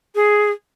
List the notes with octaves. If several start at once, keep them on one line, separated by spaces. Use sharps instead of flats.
G#4